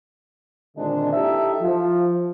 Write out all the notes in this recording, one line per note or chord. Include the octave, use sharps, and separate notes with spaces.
A#2 D3 D#3 G#3 C4 D4
D#4 E4 G4 A4 E5
F3